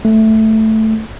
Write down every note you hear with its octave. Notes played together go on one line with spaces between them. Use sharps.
A3